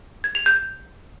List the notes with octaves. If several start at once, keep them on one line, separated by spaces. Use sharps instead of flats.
G#6
F7
G6